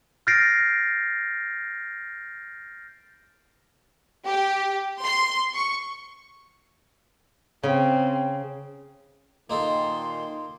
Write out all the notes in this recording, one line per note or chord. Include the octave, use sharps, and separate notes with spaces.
F6 G6 A6 A#6 C7 D7
G4
C6
C#6
C#3 C4
A#2 D#3 A#3 D#4 A4 C6